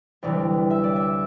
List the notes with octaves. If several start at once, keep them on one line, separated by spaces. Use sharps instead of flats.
D2 C3 E3 G3 D5
E5
D5
E5